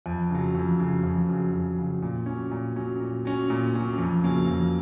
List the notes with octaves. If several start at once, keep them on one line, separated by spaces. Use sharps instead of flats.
F2
C#3 F#3
F2
C#3 F#3
F2
C#3 F#3
F2
C#3 F#3
A#2
F#3 C#4
A#2
F#3 C#4
A#2
F#3 C#4
A#2
F#3 C#4
F2
C#3 F#3 A#3 C#4
F2